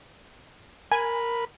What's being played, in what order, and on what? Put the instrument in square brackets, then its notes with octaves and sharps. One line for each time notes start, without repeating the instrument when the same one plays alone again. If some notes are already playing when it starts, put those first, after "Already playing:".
[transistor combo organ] A#4 B5 [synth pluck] G#5